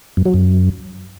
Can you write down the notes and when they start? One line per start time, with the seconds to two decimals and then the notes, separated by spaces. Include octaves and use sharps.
0.17 F#2
0.25 F#3
0.34 F#2